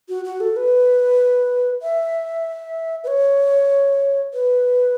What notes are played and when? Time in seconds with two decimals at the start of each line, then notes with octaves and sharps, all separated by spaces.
0.09 F#4
0.25 F#4
0.40 A4
0.57 B4
1.82 E5
3.04 B4
3.08 C#5
4.34 B4